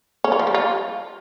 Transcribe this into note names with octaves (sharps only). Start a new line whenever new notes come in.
C#4
F4
F3
G3
F4